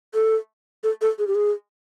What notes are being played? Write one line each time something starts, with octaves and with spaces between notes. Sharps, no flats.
A4
A4
A4
G#4
G4
G#4